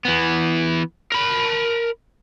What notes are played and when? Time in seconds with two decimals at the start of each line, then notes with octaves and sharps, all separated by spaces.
0.05 E3 B3
1.12 A#4 B5